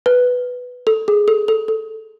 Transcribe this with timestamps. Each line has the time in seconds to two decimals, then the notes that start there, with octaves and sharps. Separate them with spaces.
0.06 B4
0.87 A4
1.08 G#4
1.28 A4
1.48 A4
1.68 A4